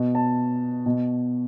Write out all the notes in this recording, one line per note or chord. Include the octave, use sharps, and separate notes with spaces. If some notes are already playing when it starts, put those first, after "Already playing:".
Already playing: B2
A5
B2